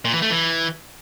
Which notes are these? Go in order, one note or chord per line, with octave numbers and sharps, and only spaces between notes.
A#2
E3
A3
E3